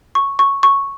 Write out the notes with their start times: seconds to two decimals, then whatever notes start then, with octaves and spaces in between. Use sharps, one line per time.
0.15 C#6
0.39 C#6
0.63 C#6